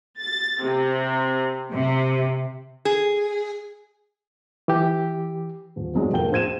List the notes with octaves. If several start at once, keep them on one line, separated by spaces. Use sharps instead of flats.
A6
C3
C3
G#4
E3 G4
D#1
F2 G#2 F#3 G#3 D4
F1 A#3 G5 G7
A#1 C5 G#6 D#7 E7